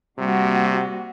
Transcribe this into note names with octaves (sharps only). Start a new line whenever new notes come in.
C3 G3 A#3 F#4